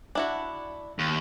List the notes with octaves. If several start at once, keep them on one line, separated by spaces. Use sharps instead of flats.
D4 E4 F#4
D#2